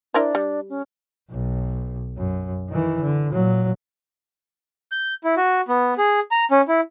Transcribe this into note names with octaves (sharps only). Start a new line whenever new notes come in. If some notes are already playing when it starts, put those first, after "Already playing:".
D4 E4 A#4 C5
G3
C#4
B1
F#2
D#3 E3
D3
A#2 F#3
G6
E4
F#4
B3
G#4
A#5
C#4
E4